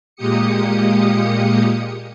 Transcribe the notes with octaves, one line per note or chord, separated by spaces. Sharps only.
A#2 G#3 A#3 G4 D#6 C#7